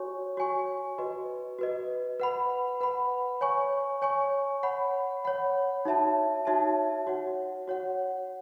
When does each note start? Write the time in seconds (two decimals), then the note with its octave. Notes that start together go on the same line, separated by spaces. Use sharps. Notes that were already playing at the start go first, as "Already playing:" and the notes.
Already playing: F#4 C#5 G#5 C#6
0.37 F#4 C#5 G#5 C#6
0.98 F#4 B4 D#5
1.59 F#4 B4 D#5
2.20 B4 F#5 B5
2.80 B4 F#5 B5
3.41 C#5 G#5 C#6
4.02 C#5 G#5 C#6
4.63 C#5 F#5 B5
5.24 C#5 F#5 B5
5.85 D#4 F#4 C#5 E5 A5
6.45 D#4 F#4 C#5 E5 A5
7.07 F#4 C#5 F#5
7.67 F#4 C#5 F#5